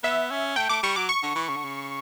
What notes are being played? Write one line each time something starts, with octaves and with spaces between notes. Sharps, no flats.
B3 E5
C#4
A3 G5
A3 D6
G3 C#6
F#3 D6
C#6
D3
E3
C#3
D3
C#3